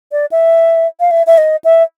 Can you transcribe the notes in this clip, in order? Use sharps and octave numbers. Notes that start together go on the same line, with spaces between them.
D5
E5
F5
E5
E5
D#5
E5